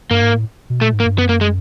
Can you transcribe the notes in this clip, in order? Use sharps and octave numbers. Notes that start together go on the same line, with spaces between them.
G2 A#3
G#2
A2
B2
A#2 A3
G#2
A#3
G2
F#2 B3
A#3
G#3